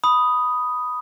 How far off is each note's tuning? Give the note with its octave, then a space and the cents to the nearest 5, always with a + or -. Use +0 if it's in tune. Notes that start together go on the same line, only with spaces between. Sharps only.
B5 +0 D#6 +0